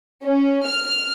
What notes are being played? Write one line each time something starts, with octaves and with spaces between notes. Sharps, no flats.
C#4
F6